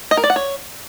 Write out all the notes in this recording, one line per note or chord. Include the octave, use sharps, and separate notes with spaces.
D#5
A#4
D5
F#5
C#5